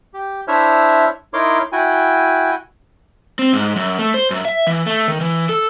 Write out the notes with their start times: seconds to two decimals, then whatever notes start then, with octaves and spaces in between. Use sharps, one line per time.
0.14 G4
0.48 D4 E4 C5 C#5 E5 F6
1.34 D#4 E4 A#4 C#5 C6 D6
1.72 E4 F#4 G5 G#5
3.39 C4
3.53 G#2
3.76 F#2
3.99 A3
4.14 C5
4.31 F#2
4.45 E5
4.67 E3
4.86 A3
5.08 D#3
5.21 E3
5.49 A4